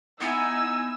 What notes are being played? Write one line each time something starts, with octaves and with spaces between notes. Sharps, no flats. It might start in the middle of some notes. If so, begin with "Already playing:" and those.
B3 D#4 E4 G#5 E6